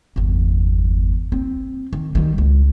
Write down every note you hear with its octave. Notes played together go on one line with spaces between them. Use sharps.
G1 E2
C4
D#3
D#3 G3
C#2